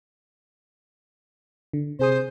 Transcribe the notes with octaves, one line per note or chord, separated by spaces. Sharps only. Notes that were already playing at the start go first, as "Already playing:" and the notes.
D3
C3 G#4 C5 D#6